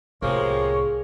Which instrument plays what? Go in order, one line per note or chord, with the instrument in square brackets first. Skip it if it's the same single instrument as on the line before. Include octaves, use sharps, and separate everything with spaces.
[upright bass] C2 A2 [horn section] C3 F3 A#3 [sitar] G#3 [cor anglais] C#5